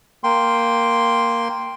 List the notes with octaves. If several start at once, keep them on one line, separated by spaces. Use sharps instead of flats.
A#3 G5 C6